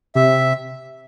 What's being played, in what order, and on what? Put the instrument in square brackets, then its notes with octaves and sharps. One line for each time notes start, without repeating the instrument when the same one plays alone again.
[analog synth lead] C3 [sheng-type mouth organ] E5